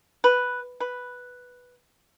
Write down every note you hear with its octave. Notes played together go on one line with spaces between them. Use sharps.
B4
B4